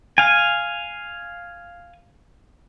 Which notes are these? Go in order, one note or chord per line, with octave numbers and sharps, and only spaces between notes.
F5 G#5